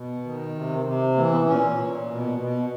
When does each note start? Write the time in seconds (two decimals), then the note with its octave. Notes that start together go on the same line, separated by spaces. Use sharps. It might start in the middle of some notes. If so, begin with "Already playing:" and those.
Already playing: B2
0.24 D#3
0.55 C3
0.85 C3
1.16 E3 A#3
1.31 B3
1.47 A#2 C#4
1.77 A#2
2.08 B2
2.38 B2